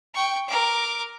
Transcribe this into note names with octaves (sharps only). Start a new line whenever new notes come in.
G5 C#6
A#4 D6